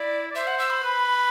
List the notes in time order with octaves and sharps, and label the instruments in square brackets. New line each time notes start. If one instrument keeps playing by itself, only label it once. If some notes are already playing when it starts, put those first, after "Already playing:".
Already playing: [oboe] E4 [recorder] D5
[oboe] D5
[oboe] C5 [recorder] E5
[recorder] F#5
E6
B5
[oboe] B4